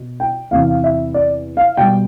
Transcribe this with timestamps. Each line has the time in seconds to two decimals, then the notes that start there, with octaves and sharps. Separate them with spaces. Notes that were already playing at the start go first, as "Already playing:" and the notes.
Already playing: B2
0.20 G5
0.51 E2 C3 E3 F5
0.84 E5
1.14 D5
1.57 F5
1.77 B2 G3 G5